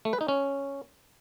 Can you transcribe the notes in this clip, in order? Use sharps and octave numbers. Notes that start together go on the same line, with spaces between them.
A3
B4
D#4
C#4